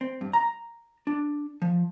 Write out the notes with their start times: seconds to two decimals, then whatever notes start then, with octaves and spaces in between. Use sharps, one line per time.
0.01 C4
0.21 G2
0.33 A#5
1.07 D4
1.62 F3